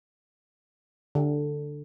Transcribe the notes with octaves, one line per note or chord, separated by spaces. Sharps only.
D3